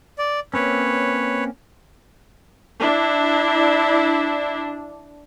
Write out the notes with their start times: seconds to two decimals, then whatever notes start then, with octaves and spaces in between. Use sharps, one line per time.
0.19 D5
0.54 A#3 C4 C#4 B4 C#5
2.80 D4 E4